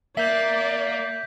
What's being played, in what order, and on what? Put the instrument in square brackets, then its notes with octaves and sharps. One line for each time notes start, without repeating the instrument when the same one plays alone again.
[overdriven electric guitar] A#3 [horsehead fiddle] D5 [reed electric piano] E5 [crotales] G6 B6